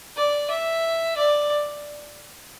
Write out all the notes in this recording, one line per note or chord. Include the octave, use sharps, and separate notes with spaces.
D5
E5
D5